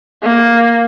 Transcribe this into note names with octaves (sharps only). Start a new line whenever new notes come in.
A#3